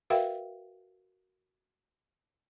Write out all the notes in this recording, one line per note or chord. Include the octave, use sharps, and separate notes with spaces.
F#4 A#4 B4 E5 F5 G5